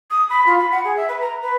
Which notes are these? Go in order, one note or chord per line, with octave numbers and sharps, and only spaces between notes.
D#6
B5
F4
B5
F#5
G#4
E5
B4
A#5
B4